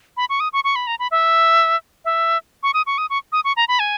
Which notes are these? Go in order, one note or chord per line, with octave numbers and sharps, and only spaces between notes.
B5
C#6
D#6
C#6
C#6
B5
A#5
B5
E5
E5
C#6
D#6
C#6
D#6
C#6
D#6
C#6
A#5
B5
G#5